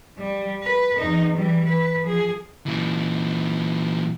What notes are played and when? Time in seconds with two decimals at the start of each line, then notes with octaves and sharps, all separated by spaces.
0.18 G3
0.63 B4
0.99 E2 D#4
1.35 E3 G3
1.65 B4
2.02 F3 G#4
2.66 A#2 E3